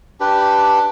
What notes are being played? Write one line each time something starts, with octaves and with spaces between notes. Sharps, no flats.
D4 G4 B4